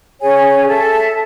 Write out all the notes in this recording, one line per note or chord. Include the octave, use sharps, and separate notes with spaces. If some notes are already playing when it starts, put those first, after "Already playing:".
C#4 G#4 C#5 G#5
A4 E5 A5